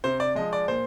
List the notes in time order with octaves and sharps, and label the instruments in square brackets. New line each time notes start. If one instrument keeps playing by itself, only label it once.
[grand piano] C3 C5
D5
F3 G#3 D#5
D5
A#2 C5